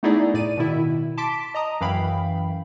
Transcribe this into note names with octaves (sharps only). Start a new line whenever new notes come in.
A3 B3 D#4 E4 G#4 D5
A2 D5 D#7
B2 D#3 E4
A5 C6 D6 B6 D7
D#5 A#5 D#6
F#2 E3 F5 G5 B5